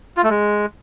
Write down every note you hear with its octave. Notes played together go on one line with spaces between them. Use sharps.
F4
A3
G#3